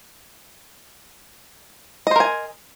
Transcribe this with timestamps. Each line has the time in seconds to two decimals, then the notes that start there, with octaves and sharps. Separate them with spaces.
2.07 D#5
2.11 C5
2.16 A#4
2.20 G#5